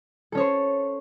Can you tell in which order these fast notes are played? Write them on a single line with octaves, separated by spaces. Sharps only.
A4 C#4 C#5 C5